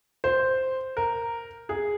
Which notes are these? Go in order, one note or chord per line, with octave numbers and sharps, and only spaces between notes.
C5
A#4
G#4